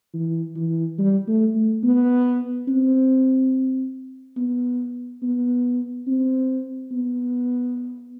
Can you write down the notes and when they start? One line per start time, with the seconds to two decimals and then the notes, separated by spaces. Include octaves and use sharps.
0.14 E3
0.56 E3
0.99 G3
1.28 A3
1.55 A3
1.83 B3
2.68 C4
4.37 B3
5.23 B3
6.07 C4
6.92 B3